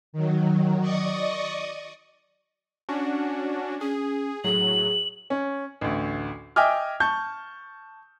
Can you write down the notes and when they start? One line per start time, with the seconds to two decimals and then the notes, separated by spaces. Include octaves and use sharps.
0.13 D#3 F#3
0.80 D5 D#5 C#6 D#6
2.89 C#4 D4 F#4
3.81 C#4 G#4
4.44 A2 F#3 G#4 F#7
5.30 C#4
5.81 A1 D2
6.56 D#5 E5 G5 G#5 D6 F6
7.00 A5 C#6 G6